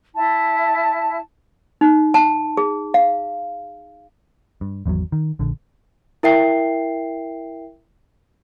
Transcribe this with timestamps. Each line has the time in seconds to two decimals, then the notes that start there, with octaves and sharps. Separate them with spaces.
0.15 E4 A5
1.81 D#4
2.14 A5
2.57 G#4
2.94 F5
4.61 G2
4.86 G#1 E2 D3 F#3
5.12 D#3
5.39 A#1 D3
6.23 E4 A#4 E5 G5 C7